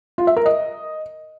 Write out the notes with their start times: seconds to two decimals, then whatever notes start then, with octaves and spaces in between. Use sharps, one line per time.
0.18 F4
0.27 E5
0.36 A#4
0.46 D#5